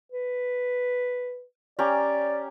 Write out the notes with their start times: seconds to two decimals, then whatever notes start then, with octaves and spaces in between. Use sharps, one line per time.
0.12 B4
1.79 C#4 G4 D5 A#5